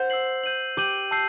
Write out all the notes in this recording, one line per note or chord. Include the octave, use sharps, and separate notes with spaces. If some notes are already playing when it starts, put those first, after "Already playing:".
Already playing: C5 F#5
E6 G6 C7 F#7
G6 D#7 F#7
G4 G6 D#7 F#7
A5 E6 G6 C7